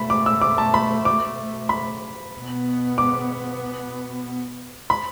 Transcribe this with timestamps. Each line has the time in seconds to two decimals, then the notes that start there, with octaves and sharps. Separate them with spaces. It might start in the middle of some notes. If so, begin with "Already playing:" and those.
Already playing: B2 A3 B5
0.10 D6
0.26 E6
0.42 D6
0.58 A5
0.74 B5
1.05 D6
1.69 B5
2.34 B2 B3
2.98 D6
4.90 B5